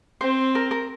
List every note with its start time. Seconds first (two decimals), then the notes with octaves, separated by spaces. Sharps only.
0.21 C4 C5
0.55 A#4
0.71 A#4